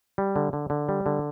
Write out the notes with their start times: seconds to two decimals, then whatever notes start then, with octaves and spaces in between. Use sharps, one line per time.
0.18 G3
0.36 D3
0.53 D3
0.70 D3
0.89 G3
1.06 D3